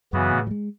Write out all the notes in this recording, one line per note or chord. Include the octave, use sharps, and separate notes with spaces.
F#2 C#3 E3 B3 F#4
A2
F#3
G#3